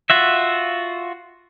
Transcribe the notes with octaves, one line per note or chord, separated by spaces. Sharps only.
F4 F#4 E5